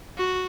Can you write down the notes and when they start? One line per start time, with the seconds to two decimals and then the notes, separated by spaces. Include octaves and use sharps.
0.18 F#4